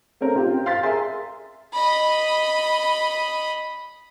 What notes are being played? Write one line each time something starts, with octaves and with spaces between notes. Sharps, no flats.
A3 C4 C#4 A#4
C4 F4 G4
F5 C6 A6 B6
G#4 A#4 E5 G#5 C6
D#5 B5